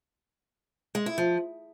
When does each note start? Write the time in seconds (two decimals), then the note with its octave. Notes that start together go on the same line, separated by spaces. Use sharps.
0.95 G#3
1.06 E4
1.18 F3